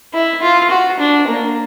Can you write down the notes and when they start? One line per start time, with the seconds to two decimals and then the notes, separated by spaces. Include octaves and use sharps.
0.13 E4
0.42 F4
0.70 F#4
1.00 D4
1.28 A#3